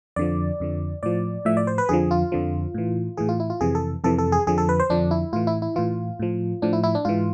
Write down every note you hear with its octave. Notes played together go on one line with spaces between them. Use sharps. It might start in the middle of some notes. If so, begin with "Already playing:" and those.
F2 D3 F3 D5
F2 D3 F3
A2 F3 D5
A2 F3 E5
D5
C5
B4
F2 D3 F3 G#4
F4
F2 D3 F3
A2 E3
A2 E3 G#4
F4
E4
F4
F2 C3 E3 G#4
A4
F2 C3 E3 A4
A4
G#4
F2 D3 F3 G#4
A4
B4
C5
F2 D3 F3 D4
E4
A2 E3 F4
E4
E4
A2 E3 F4
A2 F3
A2 F3 D4
E4
E4
D4
G#2 E3 F4